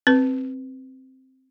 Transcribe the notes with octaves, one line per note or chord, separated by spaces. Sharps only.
C4 B4